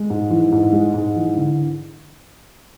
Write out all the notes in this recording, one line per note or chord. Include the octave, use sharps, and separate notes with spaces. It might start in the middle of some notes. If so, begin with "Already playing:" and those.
Already playing: G#3
G#2
E3
G#2
G#3
G#2
E3
D3